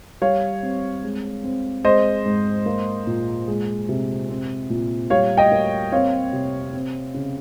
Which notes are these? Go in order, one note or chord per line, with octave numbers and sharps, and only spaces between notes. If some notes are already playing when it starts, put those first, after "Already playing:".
G3 C#5 F5
C4
G#3
C4
G#3 C5 D#5
G#2
A#3
A#2
G#3
C3
C4
A#2
G3 C#5 F5
D#5 G5
A#3
C4 C#5 F5
C3
C4
C#3